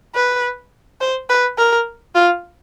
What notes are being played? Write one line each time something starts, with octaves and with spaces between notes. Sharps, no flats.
B4
C5
B4
A#4
F4